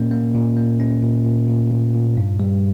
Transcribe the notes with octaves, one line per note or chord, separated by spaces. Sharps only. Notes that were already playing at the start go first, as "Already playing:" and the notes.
Already playing: A#2 A#3 C#4
A#3
A#2
A#3
C#4
A#2
A#2
A#2
A#2
A#2
G2
G3